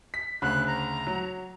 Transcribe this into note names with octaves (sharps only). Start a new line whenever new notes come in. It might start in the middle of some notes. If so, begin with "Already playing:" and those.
B6
D2 C#3 B5 F#6
A#5
F#3